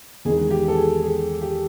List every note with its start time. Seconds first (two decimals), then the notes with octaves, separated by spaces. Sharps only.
0.25 E2 C3 D#3 G#3 G#4
0.51 G4
0.68 A4
0.77 G#4
1.03 G#4
1.41 G4